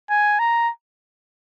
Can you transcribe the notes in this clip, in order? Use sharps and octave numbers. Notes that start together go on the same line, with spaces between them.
G#5
A#5